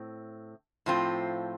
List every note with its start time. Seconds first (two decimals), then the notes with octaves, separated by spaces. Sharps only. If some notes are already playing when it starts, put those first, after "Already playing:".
Already playing: A2 C4
0.86 A2 F3 C4 F4